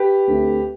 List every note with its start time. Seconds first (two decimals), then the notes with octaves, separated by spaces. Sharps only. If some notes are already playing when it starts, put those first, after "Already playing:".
Already playing: G4 B4
0.27 D2 D3 A3 C4